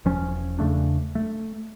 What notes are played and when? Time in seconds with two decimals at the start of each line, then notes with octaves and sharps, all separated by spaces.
0.05 E1 F3 C#4
0.59 E2 C#3 A3 D4
1.15 A3